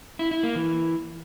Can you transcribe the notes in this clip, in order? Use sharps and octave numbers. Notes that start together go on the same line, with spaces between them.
E4
E4
A#3
E3